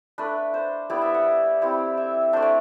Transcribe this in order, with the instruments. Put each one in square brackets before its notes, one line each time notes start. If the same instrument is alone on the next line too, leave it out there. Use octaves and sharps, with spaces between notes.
[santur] A3 D4 B4
C5
G3 B3 E4 D5
E5
F#5
G3 C4 E4
E5
A3 D4 C5
D5